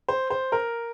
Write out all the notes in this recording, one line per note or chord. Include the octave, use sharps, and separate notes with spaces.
C5
C5
A#4